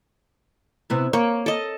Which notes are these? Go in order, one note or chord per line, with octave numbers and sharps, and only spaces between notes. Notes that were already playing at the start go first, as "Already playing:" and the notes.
C3 B3 E4
A#3 C#5
A4 D#5